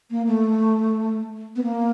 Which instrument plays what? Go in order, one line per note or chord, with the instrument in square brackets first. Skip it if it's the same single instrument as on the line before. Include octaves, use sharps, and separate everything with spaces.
[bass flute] A#3
A3
B3
A#3